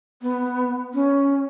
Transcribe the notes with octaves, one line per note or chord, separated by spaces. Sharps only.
B3
C#4